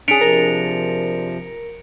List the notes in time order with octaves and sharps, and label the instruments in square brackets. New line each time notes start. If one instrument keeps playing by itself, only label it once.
[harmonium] C#4 [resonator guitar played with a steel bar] D4 G#4 [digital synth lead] B6 [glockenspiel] C#7 D7 F7
[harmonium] C3 F3 [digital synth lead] A#4